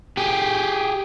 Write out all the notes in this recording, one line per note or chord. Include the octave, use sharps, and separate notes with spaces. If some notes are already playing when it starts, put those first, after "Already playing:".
G4 G#4